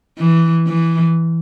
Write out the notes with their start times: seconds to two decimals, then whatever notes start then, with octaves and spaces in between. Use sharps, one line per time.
0.18 E3
0.67 E3